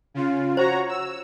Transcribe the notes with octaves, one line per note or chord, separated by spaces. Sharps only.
C#3 F4
F#4 C5 C#5 A#5
E6